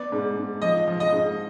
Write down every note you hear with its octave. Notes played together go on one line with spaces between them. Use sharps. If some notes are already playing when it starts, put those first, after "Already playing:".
Already playing: B3 D5
G#2
G#2
F3 D#5
F3
D#5
G#2